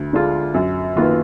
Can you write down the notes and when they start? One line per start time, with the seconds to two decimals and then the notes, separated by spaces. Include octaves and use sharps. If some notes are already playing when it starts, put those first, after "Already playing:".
Already playing: D2
0.13 D3 G#3 D4 F4
0.54 F#2
0.96 D#3 A#3 F4 B4